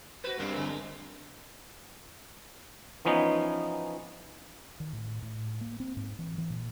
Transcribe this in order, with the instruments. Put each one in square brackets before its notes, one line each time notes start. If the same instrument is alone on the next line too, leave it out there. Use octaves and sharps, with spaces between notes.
[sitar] F#4 B4 [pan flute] C5
[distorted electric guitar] G2 C4 [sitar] G3 A#3 [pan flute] D4
[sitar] D3 G#3 A#3
[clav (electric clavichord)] E3 F3 B3 C#4 D#4 D#5
[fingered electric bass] D#3
A2
A2
A#3
C4
G#2
E3
E3
A#2